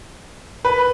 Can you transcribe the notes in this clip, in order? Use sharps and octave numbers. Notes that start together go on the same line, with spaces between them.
B4